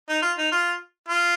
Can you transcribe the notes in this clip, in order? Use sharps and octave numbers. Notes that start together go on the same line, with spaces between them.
D#4
F4
D#4
F4
F4